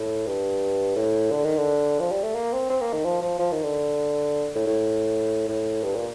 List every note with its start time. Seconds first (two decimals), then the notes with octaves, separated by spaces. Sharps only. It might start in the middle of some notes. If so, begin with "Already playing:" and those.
Already playing: A2
0.26 G2
0.96 A2
1.31 D3
1.44 D#3
1.57 D3
2.00 F3
2.11 G3
2.23 A3
2.35 A#3
2.52 C4
2.70 C4
2.81 A#3
2.93 D#3
3.04 F3
3.22 F3
3.39 F3
3.51 D#3
3.63 D3
4.55 A2
4.67 A2
5.48 A2
5.83 G2
5.95 A#2